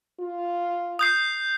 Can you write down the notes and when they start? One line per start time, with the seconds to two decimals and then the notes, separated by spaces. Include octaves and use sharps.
0.20 F4
0.99 D#6 G6 C7